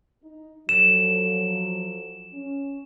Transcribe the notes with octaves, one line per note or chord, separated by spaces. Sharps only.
D#4
F3 F#3 A4 E7
C#4